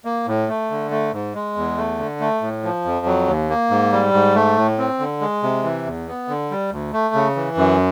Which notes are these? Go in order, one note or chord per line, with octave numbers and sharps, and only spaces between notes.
A#3
A2
A3
D3
A3
G#2
G#3
E2
A3
D3
A3
A2
F3
F2
F#3
D#2
A#3
G#2
G3
G#2
A3
A2
C4
D3
G#3
C3
E3
E2
B3
D3
G3
D2
A3
C#3
E3
F#2